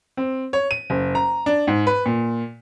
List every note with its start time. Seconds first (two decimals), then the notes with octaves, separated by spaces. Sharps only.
0.17 C4
0.53 C#5
0.71 D#7
0.90 F#1
1.15 A#5
1.46 D4
1.67 G#2
1.87 B4
2.06 A#2